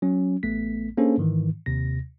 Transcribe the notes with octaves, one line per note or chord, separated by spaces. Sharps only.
F#3 C#4
A1 A3 B3 B6
A#3 C#4 D4 G#4 A4 C5
G#2 D#3 E3
D#2 C3 A#6